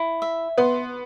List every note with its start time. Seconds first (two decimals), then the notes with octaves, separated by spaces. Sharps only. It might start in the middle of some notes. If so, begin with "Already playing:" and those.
Already playing: E4
0.22 E5
0.58 B3 C6